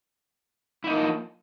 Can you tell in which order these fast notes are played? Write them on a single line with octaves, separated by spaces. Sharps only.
E4 D#4 A#3 F3